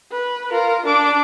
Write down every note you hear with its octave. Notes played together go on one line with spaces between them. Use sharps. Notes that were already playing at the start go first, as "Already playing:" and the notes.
B4
F4 A#4
D4 D6